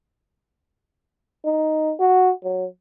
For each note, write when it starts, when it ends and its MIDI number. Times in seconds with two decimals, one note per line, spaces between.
1.45 1.94 63
2.00 2.32 66
2.44 2.66 54